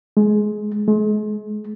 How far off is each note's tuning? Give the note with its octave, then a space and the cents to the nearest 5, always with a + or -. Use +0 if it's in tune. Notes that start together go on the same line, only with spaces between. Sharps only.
G#3 +20
G#3 +40